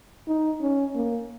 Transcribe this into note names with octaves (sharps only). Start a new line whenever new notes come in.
D#4
C#4
A#3